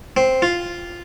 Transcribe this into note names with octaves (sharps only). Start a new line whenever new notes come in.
C4
F4